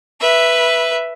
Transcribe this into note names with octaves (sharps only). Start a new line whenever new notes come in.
B4 E5